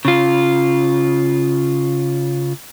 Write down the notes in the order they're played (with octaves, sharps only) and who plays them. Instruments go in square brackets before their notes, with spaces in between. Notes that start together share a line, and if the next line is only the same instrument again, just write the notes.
[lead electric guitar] C#3 F4